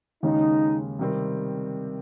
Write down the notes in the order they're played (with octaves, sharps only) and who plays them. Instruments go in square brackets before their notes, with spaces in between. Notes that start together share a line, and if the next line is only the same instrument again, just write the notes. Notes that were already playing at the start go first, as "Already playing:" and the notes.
[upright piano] D#2 C#3 G#3 C#4 [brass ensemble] D#4
[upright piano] C3 D#3 G3 C4